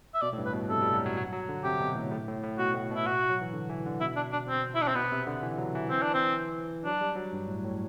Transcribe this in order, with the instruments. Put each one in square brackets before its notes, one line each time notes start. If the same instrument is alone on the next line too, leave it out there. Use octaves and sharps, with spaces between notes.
[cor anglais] E5
[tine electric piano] B2 [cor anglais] D5
[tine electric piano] A2
G2
[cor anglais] B4
[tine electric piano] B2
[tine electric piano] C3 [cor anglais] A4
[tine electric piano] G3
F#3
F#3
F#3
F#3
D3
[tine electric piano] C3 [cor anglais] G4
[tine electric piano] B2
A2
A2
A2
A2
[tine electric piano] B2 [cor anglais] F#4
[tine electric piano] A2
[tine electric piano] B2 [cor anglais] E4
[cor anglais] F#4
[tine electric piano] F#3
E3
D3
E3
D3
[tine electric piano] B2 [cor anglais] E4
[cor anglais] D4
D4
C4
E4
D4
C4
[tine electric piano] B2 [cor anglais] B3
[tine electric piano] C3
D3
E3
F#3
E3
[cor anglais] C4
D4
C4
[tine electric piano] F#3 [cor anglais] D4
[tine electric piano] G3
F#3
G2
A2
A2